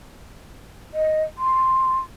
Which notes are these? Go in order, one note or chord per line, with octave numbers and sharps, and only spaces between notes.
D#5
C6